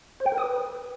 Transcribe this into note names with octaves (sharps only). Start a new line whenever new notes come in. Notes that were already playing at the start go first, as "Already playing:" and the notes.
C5
G5
A#4
D#6
B4